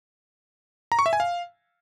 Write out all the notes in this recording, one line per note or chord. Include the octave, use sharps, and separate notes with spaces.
A#5
C#6
E5
G#5
F5